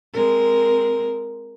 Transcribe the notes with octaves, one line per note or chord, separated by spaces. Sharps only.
G#3 C4 A#4